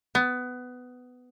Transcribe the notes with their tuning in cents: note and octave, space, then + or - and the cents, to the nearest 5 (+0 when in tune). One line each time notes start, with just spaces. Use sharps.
B3 +15